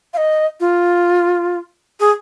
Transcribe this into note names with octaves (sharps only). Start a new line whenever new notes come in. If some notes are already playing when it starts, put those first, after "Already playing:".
F5
D#5
F4
G#4